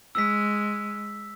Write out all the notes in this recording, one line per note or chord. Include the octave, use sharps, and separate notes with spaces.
G#3 E6 B6